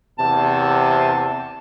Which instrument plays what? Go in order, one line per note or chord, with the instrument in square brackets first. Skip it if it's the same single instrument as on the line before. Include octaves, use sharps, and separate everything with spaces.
[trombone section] E2 C3 [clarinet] A5